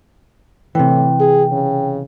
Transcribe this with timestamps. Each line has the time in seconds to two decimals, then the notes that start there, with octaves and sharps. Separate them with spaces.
0.75 A2 C3 E3 G5
1.20 G#4
1.52 C#3